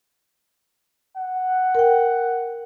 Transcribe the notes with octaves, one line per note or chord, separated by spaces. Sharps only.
F#5
A#4 G5